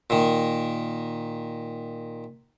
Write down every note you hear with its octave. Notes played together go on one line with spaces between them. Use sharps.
A#2 D#3